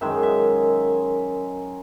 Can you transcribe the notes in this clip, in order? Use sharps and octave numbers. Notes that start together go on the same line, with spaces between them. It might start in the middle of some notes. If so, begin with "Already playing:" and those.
F#2 D#3 G#3 E5
E5